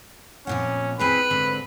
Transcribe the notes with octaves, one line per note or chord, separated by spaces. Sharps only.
F2 A#2 C#4 F#5
C4 E4 G#4 B4 B5
G#2 D3 C4